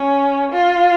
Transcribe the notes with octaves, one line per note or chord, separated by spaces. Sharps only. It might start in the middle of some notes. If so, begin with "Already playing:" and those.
Already playing: C#4
F4